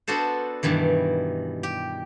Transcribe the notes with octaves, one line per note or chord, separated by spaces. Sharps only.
B3 D4 F#4 A4 C5
G2 B2 D#3 E3
G4